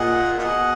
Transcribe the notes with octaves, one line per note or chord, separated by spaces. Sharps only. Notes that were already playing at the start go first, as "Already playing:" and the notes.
Already playing: A#2 G#4 D#5 F#5
A#2
B2 G#4 D#5 F#5